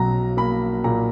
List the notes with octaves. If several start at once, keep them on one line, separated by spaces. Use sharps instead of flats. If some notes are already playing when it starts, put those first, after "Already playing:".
Already playing: B1 F#3 A#5
A#3 B5
A#2 A#5